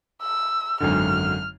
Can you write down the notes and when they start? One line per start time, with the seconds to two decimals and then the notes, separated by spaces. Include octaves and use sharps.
0.22 E6
0.80 G#1 F#2 D3 F6